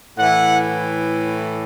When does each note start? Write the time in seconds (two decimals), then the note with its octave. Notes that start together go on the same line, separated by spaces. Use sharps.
0.17 A2 E3 F#5